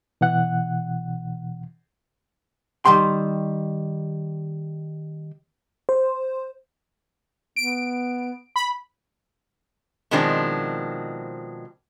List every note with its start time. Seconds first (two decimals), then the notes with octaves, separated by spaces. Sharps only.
0.21 B2 E3 F#5 F#6
2.85 D#3 G3 G5 C6
5.89 C5
7.56 B3 D7
8.56 B5
10.11 B2 D#3 F3 G#3 C4 D4